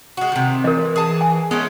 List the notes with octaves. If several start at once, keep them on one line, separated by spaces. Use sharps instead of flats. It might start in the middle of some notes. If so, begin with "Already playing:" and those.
G#3 F#4
C3 D#3
E3 A#4 D#5
G#4 A5
G#5
G#3 A3 B3 C#4